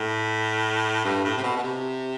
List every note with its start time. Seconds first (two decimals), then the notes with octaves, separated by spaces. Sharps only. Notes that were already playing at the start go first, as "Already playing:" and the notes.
Already playing: A2
1.04 G2
1.25 A2
1.37 C3
1.43 B2
1.56 B2
1.63 C3